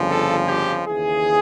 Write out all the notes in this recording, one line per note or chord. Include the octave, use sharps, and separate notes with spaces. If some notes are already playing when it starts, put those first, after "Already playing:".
Already playing: G1 F2 C#3 F3
A4
G4
D#2 C#3 E3 G#4